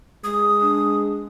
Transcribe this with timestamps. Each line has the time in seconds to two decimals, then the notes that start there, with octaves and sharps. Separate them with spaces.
0.24 G#3 D#6
0.61 D4